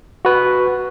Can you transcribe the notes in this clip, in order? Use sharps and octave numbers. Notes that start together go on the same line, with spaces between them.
F#4 B4